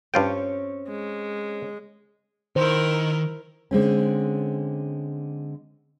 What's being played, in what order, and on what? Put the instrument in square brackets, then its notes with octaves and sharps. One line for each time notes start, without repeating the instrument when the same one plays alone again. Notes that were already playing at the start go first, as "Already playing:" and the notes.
[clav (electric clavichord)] G2 F4 G5 [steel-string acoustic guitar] C4 C#4 C#5
[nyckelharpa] G#3
[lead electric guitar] D#3 [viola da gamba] E4 A#4 [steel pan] C5
[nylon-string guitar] D3 G#3 C4 C#4